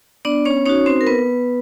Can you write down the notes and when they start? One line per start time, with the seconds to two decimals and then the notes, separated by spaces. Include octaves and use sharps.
0.25 B3 D4 D5
0.45 C#4 C#5
0.66 C#4 D#4 F#4 C#5
0.86 C4 C5
1.01 A#4
1.07 B3 B4